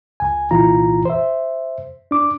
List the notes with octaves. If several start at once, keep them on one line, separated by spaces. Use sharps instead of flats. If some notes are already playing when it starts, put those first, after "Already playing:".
C#2 G#5
C2 A#2 E3 F4 A#5
C5 E5
D4 D6